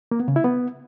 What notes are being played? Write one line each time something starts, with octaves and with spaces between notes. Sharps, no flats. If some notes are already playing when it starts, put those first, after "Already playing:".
A#3
B3
C#3
E4
B3